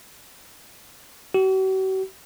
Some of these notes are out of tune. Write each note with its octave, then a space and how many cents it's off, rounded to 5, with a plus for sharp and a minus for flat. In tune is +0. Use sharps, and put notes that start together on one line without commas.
F#4 +45